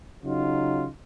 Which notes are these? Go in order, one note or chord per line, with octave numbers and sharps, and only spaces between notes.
C#3 F#3 D#4 F4